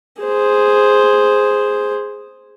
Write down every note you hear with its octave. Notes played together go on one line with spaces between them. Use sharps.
G#4 C5